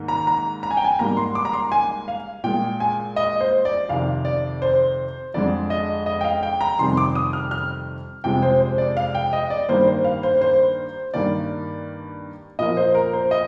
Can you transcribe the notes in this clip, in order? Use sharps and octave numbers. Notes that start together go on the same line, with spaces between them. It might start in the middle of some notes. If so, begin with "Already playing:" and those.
Already playing: G#2 D#3 A#3
A#5
A#5
A#5
G#5
G5
G#5
G#2 G3 A#3 A#5
C6
D6
A#5
C6
G#5
F5
A#2 G#3 G5
G#5
D#5
C5
D5
F2 C3 D#3 F5
D5
C5
F2 D3 G#3 D5
D#5
D#5
G5
F5
G5
A#5
F2 C3 D#3 G3 C6
D6
D#6
F6
F6
F2 C3 F3 G#3 G5
C5
C5
D5
F5
G5
D#5
D5
G2 D#3 G3 A#3 C5
C5
F5
C5
C5
G2 D#3 A#3 D5
A#2 F3 A#3 D#5
C5
A#4
C5
D#5